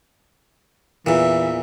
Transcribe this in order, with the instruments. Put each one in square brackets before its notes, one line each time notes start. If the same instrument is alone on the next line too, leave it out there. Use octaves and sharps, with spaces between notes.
[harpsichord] E2 A#2 [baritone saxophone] E3 [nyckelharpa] E5